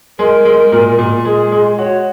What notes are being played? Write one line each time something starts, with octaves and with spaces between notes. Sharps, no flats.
G#3 A#4
G#3
A#2
A#2
G#3 G#4
G#3
F#4 C#5